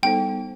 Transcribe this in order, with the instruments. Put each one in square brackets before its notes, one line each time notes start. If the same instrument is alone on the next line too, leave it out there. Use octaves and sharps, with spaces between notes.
[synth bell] G3 B3 D#4 A4 C5 [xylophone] G5